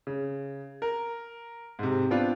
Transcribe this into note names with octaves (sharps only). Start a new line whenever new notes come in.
C#3
A#4
G#2 C3
B3 C4 D4 F4